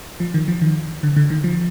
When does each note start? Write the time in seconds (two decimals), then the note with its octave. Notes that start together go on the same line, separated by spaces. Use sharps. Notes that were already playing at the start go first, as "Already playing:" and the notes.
0.20 F3
0.34 D#3
0.48 F3
0.61 D#3
1.03 D3
1.16 D3
1.30 D#3
1.44 F3